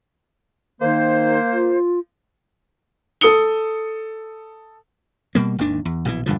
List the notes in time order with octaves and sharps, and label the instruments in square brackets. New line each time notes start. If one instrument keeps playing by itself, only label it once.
[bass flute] D#3 [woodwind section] A#3 C5
[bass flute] F4
[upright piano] A4 D#6 C#7 G7
[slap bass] B2 G3 A#3
G#1 D#2 D#3 D4
E2
A#1 B2 D3 E3
D#1 G2 D3 F3